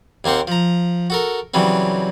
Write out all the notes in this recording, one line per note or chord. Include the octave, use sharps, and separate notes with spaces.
D#2 A#3 C4 C5 F#5
F3 A#5
F#4 A4 A#4
C#3 E3 F#3 G3 C4